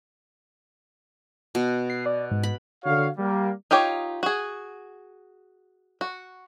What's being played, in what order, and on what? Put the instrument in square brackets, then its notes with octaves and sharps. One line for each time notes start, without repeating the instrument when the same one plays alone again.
[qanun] B2
[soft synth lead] C7
D5
G#2
[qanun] B5
[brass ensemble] D3 F#4 C#5 F5
G3 A#3
[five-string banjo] D#4 F4 G4 C#5
F#4 G#4
F#4